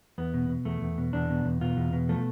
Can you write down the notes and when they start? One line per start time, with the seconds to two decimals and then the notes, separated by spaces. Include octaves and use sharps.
0.18 E2 B3
0.34 B2
0.49 B2
0.65 E2 A3
0.81 E2
0.98 B2
1.13 E2 D4
1.30 B2
1.45 E2
1.61 B2 F4
1.77 E2
1.93 B2
2.09 F3 A3